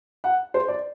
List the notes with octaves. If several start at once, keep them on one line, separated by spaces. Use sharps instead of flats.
F#5
C5
D5